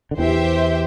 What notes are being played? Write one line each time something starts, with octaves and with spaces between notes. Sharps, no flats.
D3
E2 E3 G4 C5 E5 G5